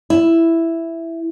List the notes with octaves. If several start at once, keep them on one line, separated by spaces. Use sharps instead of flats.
E4